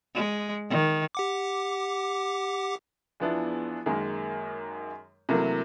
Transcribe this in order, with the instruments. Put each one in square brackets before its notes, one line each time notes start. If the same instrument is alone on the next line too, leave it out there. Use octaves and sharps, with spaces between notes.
[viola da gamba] G#3
D#3
[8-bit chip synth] G4 F#5 D6
[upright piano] E2 F3 B3 D4 E4
F#2 D#3 G#3 A#3
C3 E3 F#3 A3 A#3